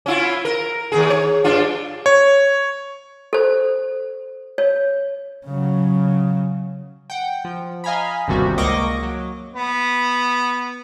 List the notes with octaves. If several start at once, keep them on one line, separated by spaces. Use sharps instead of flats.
C#4 E4 F4
A#4
D#2 B2 G#4
C#5
G2 D4 F4
C#5
A4 C5
C#5
C#3 F#3
F#5 G5
F3
D#5 F5 G#5 A#5 B5
G1 D#2 C3 G3 F#4
C#2 A#3 D#5 C#6 D6 A#6
F#3
B3